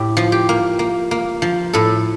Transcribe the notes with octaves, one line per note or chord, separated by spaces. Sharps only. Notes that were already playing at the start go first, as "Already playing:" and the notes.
Already playing: A2 G4
F3
G4
A#3
A#3
A#3
F3
A2 A4